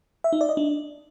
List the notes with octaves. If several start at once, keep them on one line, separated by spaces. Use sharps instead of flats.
E5
D#4
D5
D#5
D4